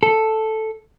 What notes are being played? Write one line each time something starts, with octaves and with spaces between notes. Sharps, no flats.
A4